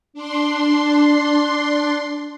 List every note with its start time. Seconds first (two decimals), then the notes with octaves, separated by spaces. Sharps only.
0.13 D4 C6